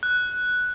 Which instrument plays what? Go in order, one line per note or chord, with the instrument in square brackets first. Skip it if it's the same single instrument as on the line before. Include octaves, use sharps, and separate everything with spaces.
[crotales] F#6